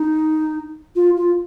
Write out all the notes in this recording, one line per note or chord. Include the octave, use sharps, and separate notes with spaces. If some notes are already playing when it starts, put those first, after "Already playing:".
Already playing: D#4
F4
F4